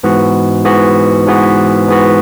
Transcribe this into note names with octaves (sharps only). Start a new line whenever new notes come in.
G#2 E3 B3 F#4
G#2 E3 B3 F#4
G#2 E3 B3 F#4
G#2 E3 B3 F#4